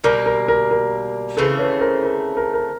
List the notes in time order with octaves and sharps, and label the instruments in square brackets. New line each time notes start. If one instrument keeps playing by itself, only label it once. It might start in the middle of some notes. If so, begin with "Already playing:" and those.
[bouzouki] B2 G3 A#3 [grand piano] A#4
[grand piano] A#4
A#4
A#4
[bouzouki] C#3 E3 A3 C4 [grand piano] A4 B4
[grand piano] B4 C#5
A#4 C5
A#4
A#4
A#4